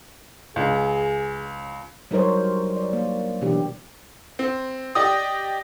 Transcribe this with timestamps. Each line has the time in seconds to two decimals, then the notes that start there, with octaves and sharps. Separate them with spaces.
0.56 C#2 G#4
2.11 F#3 G3 D#4 A#4 C5 C#5
2.76 D5
2.93 A#3
3.41 B2 E3 D4 G4
4.39 C4
4.95 G4 D5 D#5 D#6